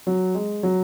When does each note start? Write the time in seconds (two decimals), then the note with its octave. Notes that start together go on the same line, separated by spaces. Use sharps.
0.07 F#3
0.35 G#3
0.63 F#3